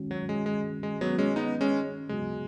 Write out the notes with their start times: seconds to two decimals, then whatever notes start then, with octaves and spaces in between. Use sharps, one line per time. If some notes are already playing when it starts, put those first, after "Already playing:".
Already playing: D#3 G#3 C#4 F#4
0.11 F#3
0.29 G#3
0.46 G#3
0.83 G#3
1.01 F#3 B3
1.18 G#3 C#4
1.36 B3 D#4
1.61 G#3 C#4
2.09 C#3 F#3 G#3 B3 F#4